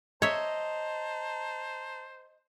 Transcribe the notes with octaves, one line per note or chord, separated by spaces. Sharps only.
C5 C#5 D#5 E5 A5 A#5